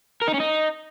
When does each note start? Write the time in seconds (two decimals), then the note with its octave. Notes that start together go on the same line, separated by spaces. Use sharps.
0.21 A#4
0.28 D#4
0.34 C#4
0.40 D#4